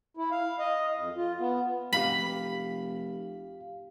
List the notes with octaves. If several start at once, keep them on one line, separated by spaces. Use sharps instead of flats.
E4
F5
D#5
F2
F4
B3
F1 G4 F5 B5 B6